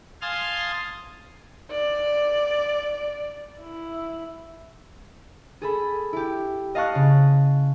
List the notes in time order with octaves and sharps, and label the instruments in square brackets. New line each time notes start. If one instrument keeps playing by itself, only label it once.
[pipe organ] F5 G#5 A5 C6 D#6 F6
[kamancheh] D5
E4
[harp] G#4 A4 B5
E4 G4
D#5 F5 A5 C#6 F#6
C#3